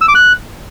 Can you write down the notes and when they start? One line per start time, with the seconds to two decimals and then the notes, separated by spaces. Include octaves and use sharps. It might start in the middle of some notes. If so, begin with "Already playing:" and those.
0.01 E6
0.08 D6
0.15 F#6